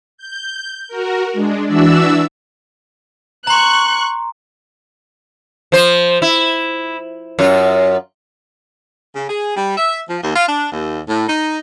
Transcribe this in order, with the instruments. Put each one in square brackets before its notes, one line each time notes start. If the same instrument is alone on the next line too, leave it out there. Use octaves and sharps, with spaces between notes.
[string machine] G6
F#4 A#4
G#3 D4
E3 D4 F#4 D5 E5 E6
[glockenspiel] A#5 C6 [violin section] C#6 F#6
[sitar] F3 C5
E4
F#2 F4
[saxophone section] C#3
G#4
G3
E5
F3
D#2
F4
D4
D#2
A2
D#4